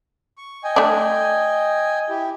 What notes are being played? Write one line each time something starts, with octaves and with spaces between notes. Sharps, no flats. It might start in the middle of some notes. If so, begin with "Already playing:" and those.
C#6
D#5 G5 G#5
A3 D4
E4 G4